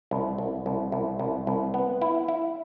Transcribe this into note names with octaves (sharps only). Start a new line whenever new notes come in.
C2
C2
C2
C2
C2
C2
B3
E4
E4